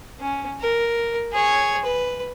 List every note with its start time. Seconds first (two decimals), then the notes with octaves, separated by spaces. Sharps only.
0.20 C#4
0.61 A#4
1.33 G#4 C#5
1.84 B4